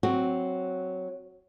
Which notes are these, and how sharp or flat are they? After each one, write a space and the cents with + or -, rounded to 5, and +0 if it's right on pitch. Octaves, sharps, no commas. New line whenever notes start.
F#3 +0 C4 +0 F#4 +0